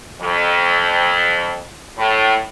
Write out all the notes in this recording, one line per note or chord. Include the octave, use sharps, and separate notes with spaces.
F2
A2